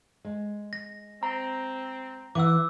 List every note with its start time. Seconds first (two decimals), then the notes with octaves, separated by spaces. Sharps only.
0.25 G#3
0.73 A#6
1.23 C4 A#5
2.35 E3 F#5 D6 E6